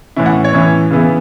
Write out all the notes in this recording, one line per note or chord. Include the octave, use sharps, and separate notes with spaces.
A2 E3 C#4 E4
F#5
C#5
A2 E3 C#4 E4
C#3 E3 B3 E4